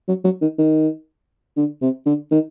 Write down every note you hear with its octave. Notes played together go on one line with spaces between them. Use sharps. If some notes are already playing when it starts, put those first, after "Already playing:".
F#3
F#3
D#3
D#3
D3
C3
D3
D#3